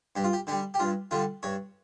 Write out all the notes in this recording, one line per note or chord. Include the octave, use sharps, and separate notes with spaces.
G2 G4
F4
G4
D3 G3 G4
G4
G2 F4
D3 G3 F4
G2 C#5